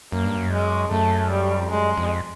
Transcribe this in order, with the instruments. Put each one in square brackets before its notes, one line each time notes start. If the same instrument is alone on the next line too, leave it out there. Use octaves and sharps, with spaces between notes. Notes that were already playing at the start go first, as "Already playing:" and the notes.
[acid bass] F#2 [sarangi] A#3
[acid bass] G2
F#2
[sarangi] G#3
[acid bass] F#2 [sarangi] A3
[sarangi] G3
[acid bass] F2
[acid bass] F#2 [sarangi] G#3
[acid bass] F2